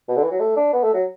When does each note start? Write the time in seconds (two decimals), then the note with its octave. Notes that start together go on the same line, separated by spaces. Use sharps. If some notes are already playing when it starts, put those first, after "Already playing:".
0.08 B2
0.16 D3
0.23 E3
0.31 F#3
0.40 A3
0.57 D4
0.73 B3
0.83 A3
0.94 F#3